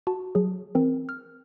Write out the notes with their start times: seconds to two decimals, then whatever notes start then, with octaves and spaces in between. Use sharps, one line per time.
0.07 F#4 A5
0.35 F#3 G#4
0.75 E3 C4 A#4
1.09 F6